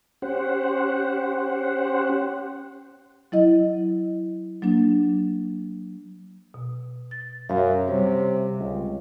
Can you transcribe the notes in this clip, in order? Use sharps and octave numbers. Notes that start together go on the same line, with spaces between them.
C#4 G4 C5 F#5
F#3 E4 D#5
F#3 A#3 D4
B2
A6
F#2 C#5 E5 F5
C3 G3 C#5
C#2